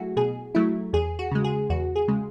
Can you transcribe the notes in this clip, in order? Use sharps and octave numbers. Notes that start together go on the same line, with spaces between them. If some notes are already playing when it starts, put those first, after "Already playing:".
Already playing: F#3 A3 E4 F#4 G#4
B2 G#4
F#3 A3 E4
E2 G#4
F#4
C#3 G#3
G#4
E2 F#4
G#4
C#3 G#3